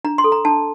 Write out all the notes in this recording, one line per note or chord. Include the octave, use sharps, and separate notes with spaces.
D4 A#5
C6
A4
A#5
D4 A5